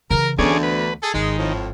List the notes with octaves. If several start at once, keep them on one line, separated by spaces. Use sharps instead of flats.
C#3 E3 A#4
D2 E3 B3 C#4 G#4 D5
B4
G#4 A4
G#1 D#3 G#3
F2 A2